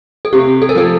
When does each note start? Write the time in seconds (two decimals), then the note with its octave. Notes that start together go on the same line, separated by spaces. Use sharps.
0.25 A4
0.33 C3 G4
0.62 A4
0.69 A#4
0.75 F3 A4